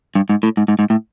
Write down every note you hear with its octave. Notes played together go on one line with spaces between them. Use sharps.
G2
G#2
A2
G#2
G#2
G#2
A2